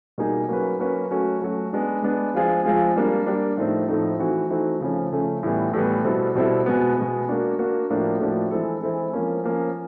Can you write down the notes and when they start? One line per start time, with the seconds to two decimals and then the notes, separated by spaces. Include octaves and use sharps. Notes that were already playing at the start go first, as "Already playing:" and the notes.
0.18 B2 G3 A#3 D#4 G#4
0.48 F#3 A#3 C#4 F#4 B4
0.79 F#3 A#3 C#4 F#4 B4
1.10 F#3 A3 C#4 F#4
1.42 F#3 A3 C#4 F#4
1.73 G#3 B3 D4
2.03 G#3 B3 D4
2.34 F3 G#3 C4 F4 G#4
2.65 F3 G#3 C4 F4 G#4
2.96 G3 A#3 D4
3.26 G3 A#3 D4
3.57 A2 F3 A3 C4 D#4
3.88 A2 F3 A3 C4 D#4
4.19 E3 A3 C4 D#4 F#4
4.50 E3 A3 C4 D#4 F#4
4.81 C#3 F3 A3 C#4
5.12 C#3 F3 A3 C#4
5.43 A2 E3 G3 B3
5.74 A2 E3 G3 B3
6.04 B2 G3 C4 E4 A4
6.35 B2 G3 C4 E4 A4
6.66 B2 G#3 B3
6.97 B2 G#3 B3
7.29 A#3 D4 F#4
7.59 A#3 D4 F#4
7.90 A2 F3 A#3 D4 F#4
8.20 A2 F3 A#3 D4 F#4
8.51 E3 G#3 C4 E4 A4
8.82 E3 G#3 C4 E4 A4
9.13 F3 A#3 C#4
9.44 F3 A#3 C#4